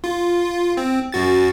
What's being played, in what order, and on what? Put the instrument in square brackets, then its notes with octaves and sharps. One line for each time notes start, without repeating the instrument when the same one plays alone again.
[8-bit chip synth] F4
C4
F#2 F#4 A6